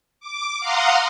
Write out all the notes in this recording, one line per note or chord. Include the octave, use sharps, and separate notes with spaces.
D6
F5 F#5 A#5 C6 D#6